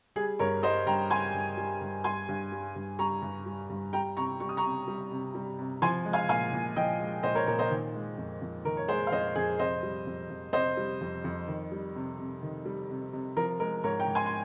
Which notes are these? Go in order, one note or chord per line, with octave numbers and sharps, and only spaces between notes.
G3 G#4
G2 A#4 C#5
G3 C5 D#5
G2 G5 A#5
G3 G#5 C6
G2
G3
G2
G3 G#5 C6
G2
G3
G2
G3 A#5 C#6
G2
G3
G2
G3 G5 A#5
C3 A#5 C#6
G3 C#6
D#6
A#5 C#6
C3
G3
C3
G3
C3
F3 G#5 C6
G#3
F5 G#5
A#2 F5 G#5
A#2
F3 D#5 G5
G#3
A#2 C5 D#5
A#4 C#5
A#2 A#4 C#5
C5 D#5
D#3
G#3
F2
F2
D#3 A#4
C#5
G#3 G#4 C5
F5
F2 C5 D#5
F2 G#4
C3 C5 D#5
G3
F2
F2
C3 C5 D#5
G3
F2
F2
D#3
G3
C3
C3
D#3
G3
C3
C3
F3 A#4
G#3 A#4
G#2 A#4 C#5
G5 A#5
G#2
G#5 C6
C6